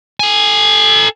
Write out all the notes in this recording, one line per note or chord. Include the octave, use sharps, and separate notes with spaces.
A4 G#5